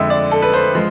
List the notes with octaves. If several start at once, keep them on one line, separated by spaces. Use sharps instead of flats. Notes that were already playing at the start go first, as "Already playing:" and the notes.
Already playing: F2 D3 G#3 E5
D5
A4
B4
C5
F3 G#3